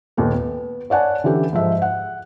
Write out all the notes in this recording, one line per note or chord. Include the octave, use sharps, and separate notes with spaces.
D#2 A#2 B3 A4
B3
C#5 D5 F#5 G#5 A5
D3 E3 C#4 G4 A4
G#2 F3 E5
F#5